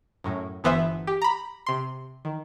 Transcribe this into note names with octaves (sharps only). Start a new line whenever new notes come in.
F#2 A2
G1 E3 B3 C5 E5
G4
A#5 B5
C3 C6
D#3